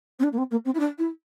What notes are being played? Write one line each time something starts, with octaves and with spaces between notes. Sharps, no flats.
C4
D4
A#3
C4
A#3
C4
E4
D4
E4